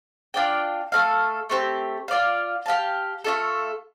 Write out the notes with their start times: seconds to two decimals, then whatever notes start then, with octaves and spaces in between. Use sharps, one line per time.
0.34 D4 F4 D5 G5
0.92 A3 C4 A4 F5
1.50 A3 C4 G4
2.08 F4 D5 F5
2.66 G4 F5 A5
3.24 A3 D4 F4 A4